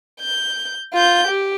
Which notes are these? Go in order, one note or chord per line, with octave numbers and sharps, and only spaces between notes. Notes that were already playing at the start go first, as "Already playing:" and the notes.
G6
F4 G6
G4